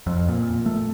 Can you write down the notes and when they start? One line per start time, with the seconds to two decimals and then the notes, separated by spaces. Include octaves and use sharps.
0.07 F2
0.29 A#2
0.66 A3